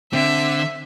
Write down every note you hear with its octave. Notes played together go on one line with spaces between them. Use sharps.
D3 C4 E5